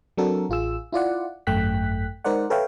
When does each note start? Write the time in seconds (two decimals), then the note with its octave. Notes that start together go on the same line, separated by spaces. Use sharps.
0.17 F#3 C4 D4 F#4 A4 A#4
0.49 A1 F4 G#4 E6
0.93 E4 F4 D5 F#5
1.47 G#1 F#2 A3 G5 F#6 B6
2.24 G#3 D#4 A#4 C5 D5 F#5
2.50 A4 B4 C#5 E5 F5 G5